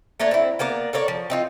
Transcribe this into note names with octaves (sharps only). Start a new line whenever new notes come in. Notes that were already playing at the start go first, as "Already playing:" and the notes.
A3 A#3 D4 C#5
C4 E4
A#3 B3 A#4 D5
A4 A#4 C#5 D5
F3
C4 D#4 F4